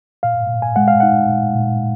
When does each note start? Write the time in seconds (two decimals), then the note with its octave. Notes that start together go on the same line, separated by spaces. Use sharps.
0.23 A#2 F5
0.49 A#2
0.62 G#5
0.76 G#3 F#5
0.88 F5
1.00 D#4 F#5
1.29 A#2
1.55 A#2